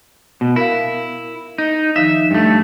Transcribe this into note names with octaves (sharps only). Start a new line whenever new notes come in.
B2
E4 A#4 F5
D#4
D#3 F3 D#4 E5
G2 A3